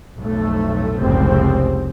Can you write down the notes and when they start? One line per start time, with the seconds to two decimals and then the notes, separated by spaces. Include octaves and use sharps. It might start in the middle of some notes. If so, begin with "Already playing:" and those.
0.18 B1 F2 A2 A3
0.99 F1 C2 G#2 C#3 F3 C4